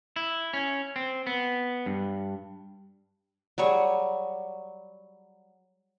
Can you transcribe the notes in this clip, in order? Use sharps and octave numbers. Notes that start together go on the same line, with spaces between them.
E4
C#4
C4
B3
G2
F#3 G3 G#4 C#5